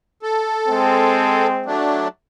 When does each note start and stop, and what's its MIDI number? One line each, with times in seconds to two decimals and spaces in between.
0.23 1.47 69
0.68 1.75 56
0.68 1.75 60
1.66 2.08 54
1.66 2.08 57
1.66 2.08 62